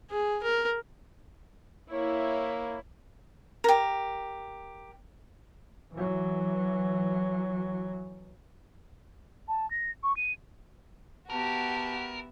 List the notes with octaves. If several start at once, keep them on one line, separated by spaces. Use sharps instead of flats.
G#4
A#4
A#3 E4 C#5
G4 A#4
E3 F#3
A5
A#6
C#6
D#7
B3 F#4 G4 A#4 E5 A5